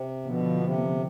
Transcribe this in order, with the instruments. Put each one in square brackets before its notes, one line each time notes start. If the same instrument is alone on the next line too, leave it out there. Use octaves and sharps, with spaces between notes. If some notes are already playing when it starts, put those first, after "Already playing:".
Already playing: [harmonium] C3
[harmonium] B2 [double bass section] D3 F3 B3
[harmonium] C3